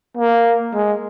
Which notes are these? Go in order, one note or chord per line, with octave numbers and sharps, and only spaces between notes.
A#3
G#3